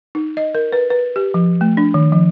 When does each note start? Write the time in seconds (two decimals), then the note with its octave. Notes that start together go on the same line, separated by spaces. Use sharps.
0.15 D#4
0.37 D#5
0.55 A#4
0.72 B4
0.90 B4
1.16 G4
1.34 F3
1.61 A3
1.77 D4
1.94 D#3
2.12 F3